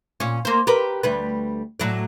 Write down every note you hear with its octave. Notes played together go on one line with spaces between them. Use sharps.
A#2 C#4
A#3 C5
G4 A#4 B4
D2 G3 B4
A2 F#3 D5